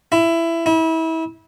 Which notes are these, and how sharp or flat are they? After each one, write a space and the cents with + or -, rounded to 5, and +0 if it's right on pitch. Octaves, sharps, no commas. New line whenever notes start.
E4 +15
E4 -30